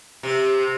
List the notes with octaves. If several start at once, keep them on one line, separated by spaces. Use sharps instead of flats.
C3